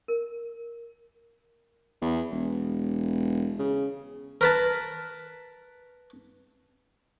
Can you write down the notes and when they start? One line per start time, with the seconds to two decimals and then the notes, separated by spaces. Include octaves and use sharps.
0.08 A#4
2.01 E2
2.31 E1
3.59 C#3
4.41 A#4 B4 A5